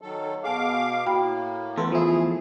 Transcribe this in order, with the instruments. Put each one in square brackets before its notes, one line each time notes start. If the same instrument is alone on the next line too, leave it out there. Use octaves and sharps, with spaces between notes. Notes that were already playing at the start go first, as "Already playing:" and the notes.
[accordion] D#3 F#3 A4
[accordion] B2 F5 D6 [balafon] G#4 G#5 A5
[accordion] A2 A#3 [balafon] F#4 G5 B5
[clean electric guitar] E2 A3 [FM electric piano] B3 A4 [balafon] C6
[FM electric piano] F3 E4 [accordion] G#4